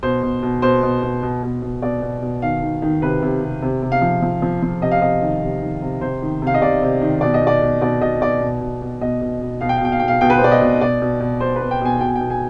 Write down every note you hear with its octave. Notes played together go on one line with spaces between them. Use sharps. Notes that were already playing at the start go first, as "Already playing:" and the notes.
B2 C5
B2
B2
B2 C5
B2
B2
B2
B2
B2
B2 D5
B2
B2
D#3 F5
D#3
D#3
C3 B4
C3
C3
C3
C3
F5
F3
F3
F3
F3
C3 D#5
F5
C3 D#5
D#3
C3
D#3
C3
C3 C5
D#3
C3 F5
D#5
C3 D5
C3
D#3
B2 D5
D#5
B2
D5
B2
B2 D5
B2 D#5
B2 D5
B2
B2
B2
B2 D#5
B2
B2
B2 F5
G5
F5
B2 G5
F5
B2 G5
F5
B2 G5
B4
C5
B2 D5
D#5
B2
B2 D5
B2
B2
B2 C5
B4
B2
G5
B2 G#5
B2 G5
G#5
G5
B2
G#5